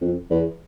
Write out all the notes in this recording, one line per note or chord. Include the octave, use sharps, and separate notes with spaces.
F2
E2